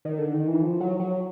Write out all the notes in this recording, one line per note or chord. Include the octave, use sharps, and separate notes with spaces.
D#3
D3
D#3
E3
F3
F#3
F#3